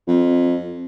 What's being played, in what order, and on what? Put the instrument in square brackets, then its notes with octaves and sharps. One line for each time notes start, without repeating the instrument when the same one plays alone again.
[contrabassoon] F2